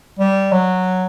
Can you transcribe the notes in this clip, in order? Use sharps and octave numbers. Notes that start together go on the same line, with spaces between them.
G3
F#3